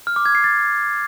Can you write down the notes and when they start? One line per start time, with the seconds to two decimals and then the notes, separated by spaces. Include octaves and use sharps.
0.07 F6
0.16 D6
0.25 G#6
0.35 C7
0.44 A6